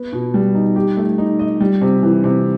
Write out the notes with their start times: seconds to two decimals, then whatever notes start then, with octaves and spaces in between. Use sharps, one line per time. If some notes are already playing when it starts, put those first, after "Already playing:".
Already playing: B3
0.13 B2
0.34 G3
0.54 D#4
0.76 G4
0.97 A3
1.18 D#4
1.39 D#5
1.61 G3
1.81 C3
2.03 E3
2.24 C3